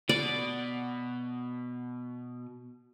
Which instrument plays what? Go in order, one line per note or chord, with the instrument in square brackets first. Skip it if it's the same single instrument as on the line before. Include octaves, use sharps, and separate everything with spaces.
[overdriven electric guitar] B2 [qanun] D5